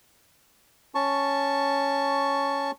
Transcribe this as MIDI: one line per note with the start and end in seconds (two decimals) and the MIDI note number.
0.95 2.71 61
0.95 2.71 81
0.95 2.71 85